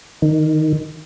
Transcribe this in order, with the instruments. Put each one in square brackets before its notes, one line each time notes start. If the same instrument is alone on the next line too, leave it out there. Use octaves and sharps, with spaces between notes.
[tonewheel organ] D#3